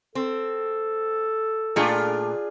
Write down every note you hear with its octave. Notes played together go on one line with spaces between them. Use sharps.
C4 A4
A#2 A3 D4 F4 G#4 G5